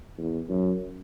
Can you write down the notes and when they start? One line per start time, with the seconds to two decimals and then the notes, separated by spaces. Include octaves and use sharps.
0.18 E2
0.49 F#2